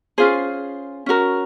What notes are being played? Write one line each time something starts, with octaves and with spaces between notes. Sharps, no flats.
C#4 F4 G#4 C5
C#4 F#4 A#4